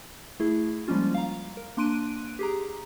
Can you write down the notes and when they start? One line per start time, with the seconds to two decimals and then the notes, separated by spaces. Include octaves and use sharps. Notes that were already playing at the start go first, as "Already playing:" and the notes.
0.40 A3 E4 G#4
0.88 F3 G3 G#3 A#3 C#4 F4
1.14 F5 A#5
1.57 A#4
1.77 A#3 D4 C6 F#6 D7 D#7
2.39 G4 G#4 A#5